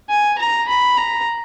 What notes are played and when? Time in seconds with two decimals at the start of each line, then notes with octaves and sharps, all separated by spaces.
0.10 G#5
0.38 A#5
0.68 B5
0.97 A#5